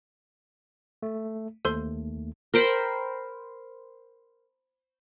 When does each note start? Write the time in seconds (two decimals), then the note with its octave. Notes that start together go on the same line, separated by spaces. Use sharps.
1.03 A3
1.65 D#2 A3 A4 C5 C6
2.54 A#4 C5 G5 B5